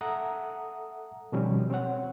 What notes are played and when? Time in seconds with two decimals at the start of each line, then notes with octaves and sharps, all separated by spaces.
0.01 A4 E5 F#5 A#5 D#6
1.32 B2 D#3 F3 G3 C4 C#4
1.70 C4 C#4 C#5 F#5